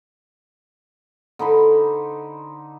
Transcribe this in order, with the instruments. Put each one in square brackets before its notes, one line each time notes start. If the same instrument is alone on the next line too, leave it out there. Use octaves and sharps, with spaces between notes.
[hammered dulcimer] D3 D#4 C5 B5